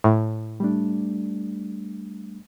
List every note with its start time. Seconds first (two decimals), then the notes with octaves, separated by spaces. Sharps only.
0.04 A2
0.60 G3 A3 D4